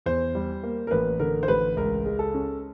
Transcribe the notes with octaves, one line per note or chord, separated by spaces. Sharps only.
E2 C5
G3
A#3
A#4
A1 B4
D3 A#4
C5
A1 B4
C#2 A#4
G#3
A4
C#4